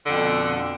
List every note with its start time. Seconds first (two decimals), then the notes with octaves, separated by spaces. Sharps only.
0.04 D3
0.09 F2
0.14 B2